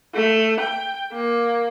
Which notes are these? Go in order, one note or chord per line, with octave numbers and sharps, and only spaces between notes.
A3
G5
A#3